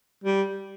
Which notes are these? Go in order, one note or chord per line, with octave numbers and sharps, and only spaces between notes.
G3